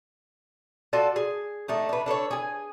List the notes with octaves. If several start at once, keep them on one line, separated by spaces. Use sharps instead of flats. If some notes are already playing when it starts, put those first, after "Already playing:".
F4 F#4 A4 D5
G#4
A3 D4 D#4
D4 B4
D4 A4 A#4 C#5
G#4 G#5